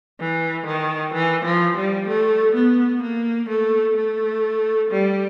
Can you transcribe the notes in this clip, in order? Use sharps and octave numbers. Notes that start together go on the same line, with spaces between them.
E3
D#3
E3
F3
G3
A3
B3
A#3
A3
A3
G3